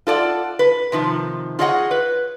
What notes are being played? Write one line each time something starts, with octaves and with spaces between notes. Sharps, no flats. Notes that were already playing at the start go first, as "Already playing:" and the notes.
F4 A4 D5 F#5
B4
C3 D#3 F3
F4 G#4 C#5 D#5 F5 F#5
B4